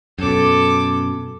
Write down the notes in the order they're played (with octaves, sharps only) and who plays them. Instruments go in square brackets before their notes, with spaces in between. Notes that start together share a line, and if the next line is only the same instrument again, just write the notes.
[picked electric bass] F#2 B2 [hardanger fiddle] A4 D6